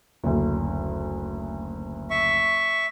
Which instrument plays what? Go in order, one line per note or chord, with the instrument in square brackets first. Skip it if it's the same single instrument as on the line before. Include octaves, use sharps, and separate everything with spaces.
[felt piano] F#1 D2
[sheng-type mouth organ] E5 C#6